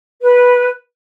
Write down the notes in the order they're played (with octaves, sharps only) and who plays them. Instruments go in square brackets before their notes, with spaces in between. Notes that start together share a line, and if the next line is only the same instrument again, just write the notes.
[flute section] B4